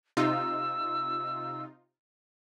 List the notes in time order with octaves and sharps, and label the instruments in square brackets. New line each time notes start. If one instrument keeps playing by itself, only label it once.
[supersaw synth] C3 D#4 F4 [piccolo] E6